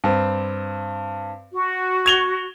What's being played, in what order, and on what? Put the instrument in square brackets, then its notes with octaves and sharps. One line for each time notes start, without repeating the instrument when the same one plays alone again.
[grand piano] G2 C4
[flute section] F#4
[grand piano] G#6 F7 G7